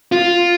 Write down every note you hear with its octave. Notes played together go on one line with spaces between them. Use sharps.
F4